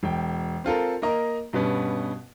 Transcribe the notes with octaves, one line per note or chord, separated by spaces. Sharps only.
E1 G5
C4 F4 A4 A#4
A#3 A#4 D#5 A#5
G2 B2 B3 C#4